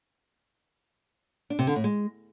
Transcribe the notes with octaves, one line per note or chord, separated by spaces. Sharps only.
D4
C3
D3
A2
G#3